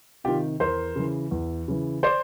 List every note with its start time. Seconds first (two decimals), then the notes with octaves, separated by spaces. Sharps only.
0.24 C3 D#3 F4 G4
0.60 E2 A#4 C5
0.96 C#3 E3
1.31 E2
1.68 C#3 E3
2.03 C5 D5